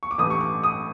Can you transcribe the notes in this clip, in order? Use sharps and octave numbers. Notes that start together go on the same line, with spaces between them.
C#6
D6
A1 G2 E3 A3 D#6
C#6
D6
D#6